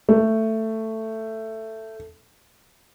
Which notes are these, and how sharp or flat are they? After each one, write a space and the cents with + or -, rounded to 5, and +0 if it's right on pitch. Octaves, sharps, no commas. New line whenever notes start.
A3 +10